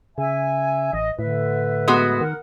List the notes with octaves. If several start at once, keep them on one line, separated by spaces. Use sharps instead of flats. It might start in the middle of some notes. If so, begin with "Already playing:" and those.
C#3 E5 G#5
A1 D#5
A2 D3 B4 E5
G#3 B3 F#4
D#3 A#4 F#5